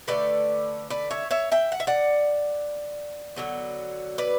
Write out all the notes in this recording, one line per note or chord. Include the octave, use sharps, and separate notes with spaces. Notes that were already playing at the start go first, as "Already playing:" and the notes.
D3 F#3 A3 B4 D5
B4 D5
C#5 E5
C#5 E5
E5 G5
F#5
E5
D5 F#5
D3 F#3 B3
B4 D5